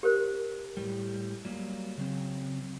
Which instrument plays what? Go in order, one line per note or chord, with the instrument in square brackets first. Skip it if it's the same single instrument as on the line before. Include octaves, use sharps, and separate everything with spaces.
[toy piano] G4 A#4 C5
[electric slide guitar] A2 G3
F#3 G3 A#3
C#3 F#3 C4